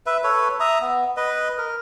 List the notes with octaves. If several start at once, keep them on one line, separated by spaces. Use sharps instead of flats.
B4 E5
A4 B4 C#5
E5 A#5 D#6
B3
B4 D#5
A#4